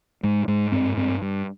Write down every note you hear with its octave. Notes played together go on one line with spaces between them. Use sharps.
G#2 G#3
G#2 G#3
G2 C4
G2 C4
G2